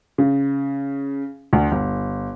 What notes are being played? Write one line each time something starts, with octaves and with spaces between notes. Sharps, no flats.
C#3
D2
G1